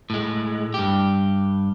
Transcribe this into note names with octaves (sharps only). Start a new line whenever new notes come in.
A2 G#3
G2 G4